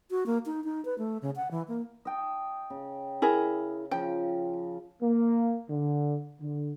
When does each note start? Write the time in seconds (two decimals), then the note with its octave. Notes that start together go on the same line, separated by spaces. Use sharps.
0.11 F#4
0.26 A#3
0.46 D#4
0.64 D#4
0.85 B4
0.98 A3
1.22 C#3
1.36 F#5
1.51 E3
1.68 A#3
2.05 D#5 G5 A5
2.70 C#3
3.22 E4 G#4 A#4
3.91 C#3 F3 G5
5.01 A#3
5.69 D3
6.41 D3